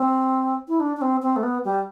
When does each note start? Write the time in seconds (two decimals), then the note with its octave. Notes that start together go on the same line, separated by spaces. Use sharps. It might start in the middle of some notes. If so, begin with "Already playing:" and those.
Already playing: C4
0.68 E4
0.80 D4
0.97 D4
1.02 C4
1.22 C4
1.36 A3
1.43 B3
1.65 G3